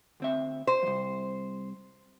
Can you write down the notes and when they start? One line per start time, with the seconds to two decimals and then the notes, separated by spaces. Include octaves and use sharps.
0.20 D2 C4 E5
0.67 C5
0.83 C2 F2